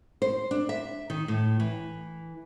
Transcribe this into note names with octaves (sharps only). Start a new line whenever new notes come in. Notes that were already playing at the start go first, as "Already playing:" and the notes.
C5
D4
E5
D#3
A2
E3